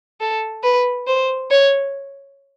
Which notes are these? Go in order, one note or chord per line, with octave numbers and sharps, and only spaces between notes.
A4
B4
C5
C#5